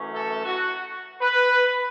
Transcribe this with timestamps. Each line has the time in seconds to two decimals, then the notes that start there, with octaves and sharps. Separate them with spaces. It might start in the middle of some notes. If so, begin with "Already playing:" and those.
Already playing: F#2 E3 A3 C#4
0.14 A4
0.45 F#4
1.21 B4